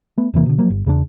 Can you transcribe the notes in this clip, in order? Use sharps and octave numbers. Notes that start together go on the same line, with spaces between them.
A3 B3
E1 C3 E3 A#3
B2 D3
F3 F#3 A#3
G1
E2 C#3 A#3 D4